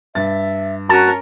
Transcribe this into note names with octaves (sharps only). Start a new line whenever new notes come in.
G2 E5 A6
C#4 F#4 A#4 A5